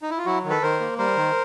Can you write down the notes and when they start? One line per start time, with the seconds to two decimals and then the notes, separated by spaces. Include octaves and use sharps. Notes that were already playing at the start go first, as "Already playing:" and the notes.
0.02 D#4
0.11 E4
0.18 F4
0.26 F#3 E4 F#4
0.44 D#3
0.50 A4 B4
0.62 D#3 A#4 C5
0.80 A#3
0.98 G3 A#4 C5
1.17 D#3